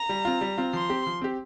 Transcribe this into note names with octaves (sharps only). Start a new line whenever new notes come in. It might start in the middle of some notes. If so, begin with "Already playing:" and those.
Already playing: A#5
G3
C4 F4
G3
C4 F4
F3 C6
C4 G4
F3
C4 G4